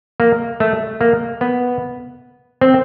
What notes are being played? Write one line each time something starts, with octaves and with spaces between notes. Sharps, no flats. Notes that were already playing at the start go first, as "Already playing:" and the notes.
A#3
A3
A#3
B3
C4